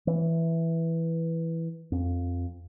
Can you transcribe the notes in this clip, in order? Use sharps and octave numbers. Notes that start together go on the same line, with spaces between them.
E3
F2